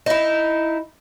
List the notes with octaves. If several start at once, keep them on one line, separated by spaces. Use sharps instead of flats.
D#4 E4